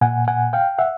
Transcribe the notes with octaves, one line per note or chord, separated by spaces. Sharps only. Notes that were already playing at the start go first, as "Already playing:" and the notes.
A#2 F#5 G#5
F#5 G#5
F5 G5
E5 F#5